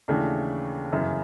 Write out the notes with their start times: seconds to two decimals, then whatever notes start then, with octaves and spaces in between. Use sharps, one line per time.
0.08 D#2 C#3 E3 A3 D4
0.92 G1 F#2 C#3 E3